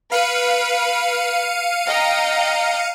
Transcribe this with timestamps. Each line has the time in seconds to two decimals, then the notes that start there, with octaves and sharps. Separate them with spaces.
0.12 B4 F5 C#7 D#7
1.86 D#5 G5 A#5